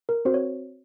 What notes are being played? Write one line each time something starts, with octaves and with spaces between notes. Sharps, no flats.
A#4
C4 F#4 C5
C#5